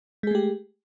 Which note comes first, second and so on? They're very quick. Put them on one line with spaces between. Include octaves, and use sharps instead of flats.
G#3 G#4 A3 G4